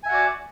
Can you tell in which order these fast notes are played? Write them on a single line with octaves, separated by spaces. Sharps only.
G#5 E5 F#5 F#4 D5